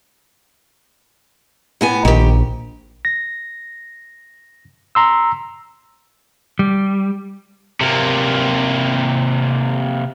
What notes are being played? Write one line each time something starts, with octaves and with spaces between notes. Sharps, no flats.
A2 B3 G#5
A#1 D#3 G4
A#6
A#5 C6 E6
G3
C3 A#3